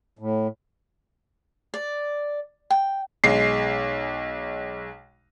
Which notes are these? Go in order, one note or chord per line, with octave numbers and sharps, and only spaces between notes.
A2
D5
G5
B1 G#3 C7